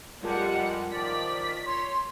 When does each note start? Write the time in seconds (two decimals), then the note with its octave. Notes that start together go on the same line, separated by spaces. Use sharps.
0.23 F2 G3 G#3 F4 A#4 F#5 A5
0.92 D#3 F3 D5 B6
1.66 C#5 C6